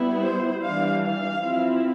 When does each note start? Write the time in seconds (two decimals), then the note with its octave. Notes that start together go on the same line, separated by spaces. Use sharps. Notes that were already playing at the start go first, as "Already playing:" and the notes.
Already playing: G3 B3 E4
0.22 C5
0.62 E3 G3 D4 F5
1.02 F5
1.41 F3 C4 E4